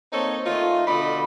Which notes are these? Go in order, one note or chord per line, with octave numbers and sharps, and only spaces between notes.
A#3 C4 D#4 A4 C#5
D#3 A3 D#4 F4
B2 D3 A3 D5 D#5 B5